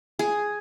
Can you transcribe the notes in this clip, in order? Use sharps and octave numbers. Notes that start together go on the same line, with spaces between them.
G#4